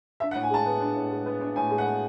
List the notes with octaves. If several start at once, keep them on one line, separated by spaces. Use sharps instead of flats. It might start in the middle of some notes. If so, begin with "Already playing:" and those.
D4 E5
F#5
A2
G#5
G#3 A5
B3
D4
A2
G#3
B3
D4
A2 G#5
G#3
F#5
B3